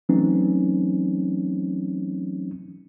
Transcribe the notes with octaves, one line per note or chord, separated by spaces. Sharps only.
E3 F#3 A3 C4 C#4 D#4